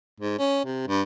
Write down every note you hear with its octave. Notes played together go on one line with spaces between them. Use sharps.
G#2
C#4
C3
G2